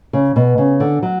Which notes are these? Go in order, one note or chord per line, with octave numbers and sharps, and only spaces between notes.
C#3
B2
C#3
D3
F#3